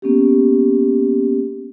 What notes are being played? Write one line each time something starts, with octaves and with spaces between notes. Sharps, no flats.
A#3 B3 C#4 G4